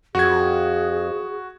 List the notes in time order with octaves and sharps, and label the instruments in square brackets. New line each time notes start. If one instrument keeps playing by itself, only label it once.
[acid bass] F2 [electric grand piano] F#4 G#6 [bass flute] G#4